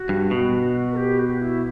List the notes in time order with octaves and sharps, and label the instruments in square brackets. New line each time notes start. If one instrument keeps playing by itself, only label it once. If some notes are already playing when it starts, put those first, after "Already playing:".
Already playing: [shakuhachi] F#4
[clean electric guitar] G2
B2
[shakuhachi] A#4
G4
F#4
E4